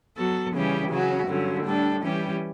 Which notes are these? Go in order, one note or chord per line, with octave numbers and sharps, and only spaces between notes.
F#3 B3 F#4 A4
C#3 E3 G3 C#4 G4
C#3 F#3 C#4 F#4
G2 D3 F#3 C#4
A2 G3 D4 A4
E3 G3 C#4 G4